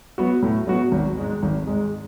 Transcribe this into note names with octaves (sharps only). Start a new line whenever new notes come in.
F#3 B3 F#4
A2
F#3 B3 F#4
G#1
G#2 G#3
G#1
G#2 G#3